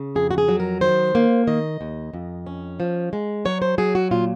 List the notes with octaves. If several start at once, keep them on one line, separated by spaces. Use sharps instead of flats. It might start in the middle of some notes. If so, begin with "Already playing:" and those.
Already playing: C#3
F2 G#4
F#4
G#4
F#3
A#4
D#3 C5
A#3
D#3 D#5
D#2
F2
C#4
F3
G#3
F#3 C#5
C5
F#3 G#4
F#4
A#2 F4